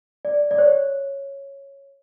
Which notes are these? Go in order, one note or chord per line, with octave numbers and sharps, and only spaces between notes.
D5
D5
C#5